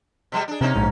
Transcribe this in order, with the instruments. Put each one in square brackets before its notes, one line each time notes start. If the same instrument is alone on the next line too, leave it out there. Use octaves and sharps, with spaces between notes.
[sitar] B2 G3 G#3
D4 G#4
[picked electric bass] C3 [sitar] A#3 C#4 D#4
[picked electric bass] A#1 G#2